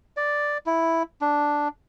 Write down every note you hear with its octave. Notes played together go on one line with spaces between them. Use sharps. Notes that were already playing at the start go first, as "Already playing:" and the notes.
D5
E4
D4